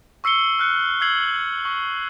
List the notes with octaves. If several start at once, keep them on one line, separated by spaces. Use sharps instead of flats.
C#6 E6 C7 C#7 G7
F6 F#6 C#7
E6 F6 G#6 C7 F#7
C#6